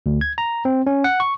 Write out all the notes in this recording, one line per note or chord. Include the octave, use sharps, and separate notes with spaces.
D2
G#6
A#5
C4
C#4
F#5
C#6